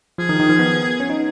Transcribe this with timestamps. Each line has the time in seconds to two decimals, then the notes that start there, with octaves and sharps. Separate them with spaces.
0.18 F3 G#4
0.29 D#3
0.39 D#3
0.49 F3
0.59 B3
1.00 C#4
1.10 D#4